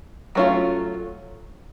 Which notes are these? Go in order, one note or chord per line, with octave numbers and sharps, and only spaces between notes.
F#3 A3 C#4 F4